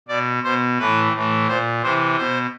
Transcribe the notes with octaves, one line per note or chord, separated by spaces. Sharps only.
B2 D5
B2 C5
A2 E3 B4
A2 E3
A#2 C5
C3 E3 C5
B2 C5